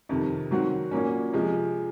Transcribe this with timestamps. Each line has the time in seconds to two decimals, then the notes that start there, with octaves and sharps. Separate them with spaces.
0.09 F2 C3 D#3
0.51 D#3 F#3 C4 F#4
0.91 A#2 F#3 A#3 C#4
1.33 C3 F3 G#3